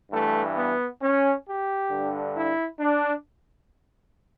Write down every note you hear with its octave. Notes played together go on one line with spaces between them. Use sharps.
G2 E3 A3
B3
C#4
G4
G2 D3
E4
D4